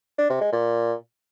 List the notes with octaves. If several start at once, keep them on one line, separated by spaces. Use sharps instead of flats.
D4
C3
G#3
A#2